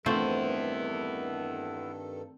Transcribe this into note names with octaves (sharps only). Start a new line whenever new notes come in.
G2 D#3 A3 B3 C4 E4 F4 A4